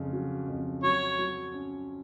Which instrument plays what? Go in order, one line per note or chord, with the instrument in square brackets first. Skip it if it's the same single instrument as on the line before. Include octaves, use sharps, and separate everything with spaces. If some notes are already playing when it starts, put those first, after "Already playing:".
Already playing: [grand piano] F2 C#3
F#3
F2
[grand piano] F#3 [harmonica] C#5
[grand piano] F#3
C#4